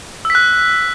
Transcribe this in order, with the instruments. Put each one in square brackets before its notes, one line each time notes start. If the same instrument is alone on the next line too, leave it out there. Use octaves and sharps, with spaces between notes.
[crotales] E6
B6
F#6